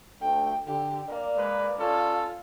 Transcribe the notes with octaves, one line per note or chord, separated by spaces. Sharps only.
D2 A3 D4 G5
D3 G4
A#3 D5
G#3 B4
C#4 F4 A4